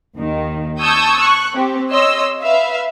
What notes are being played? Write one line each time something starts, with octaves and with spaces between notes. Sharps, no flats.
D#2 D#3
A5 C#6 D#6 E6 G6 G#6
C#6 F#6
C4 G4
C#5 D#5 C6 E6
B4 E5 F5